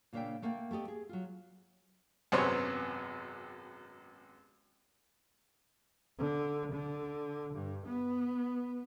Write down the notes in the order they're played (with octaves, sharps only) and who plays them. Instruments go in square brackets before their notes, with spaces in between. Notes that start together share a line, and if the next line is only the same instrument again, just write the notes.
[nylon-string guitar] A#2 C#3 A#3 D4 E5 G5
A3 A#3 A#4 F#5 G5
A3 B3 G4 D#5
G#4
F#3 F4
[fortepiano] G#1 F#2 C3 B3 C5 C#5
[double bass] D3
D3
G2
B3